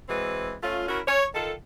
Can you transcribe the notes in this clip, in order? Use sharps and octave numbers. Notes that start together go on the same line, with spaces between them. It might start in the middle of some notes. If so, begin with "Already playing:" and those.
E3 G#3 C4 F#4 B4
A3 C#4 F4
C#4 E4 F#4 A#4
C#5
D#3 F4 A4